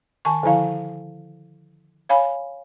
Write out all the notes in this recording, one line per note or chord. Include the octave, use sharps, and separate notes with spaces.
D#3 G#5 A5 C#6
D3 F3 E4 F5
C#5 F5 G#5 B5